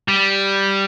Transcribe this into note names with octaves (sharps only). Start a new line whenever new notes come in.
G3